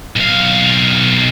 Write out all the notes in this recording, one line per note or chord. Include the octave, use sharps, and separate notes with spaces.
B1 F5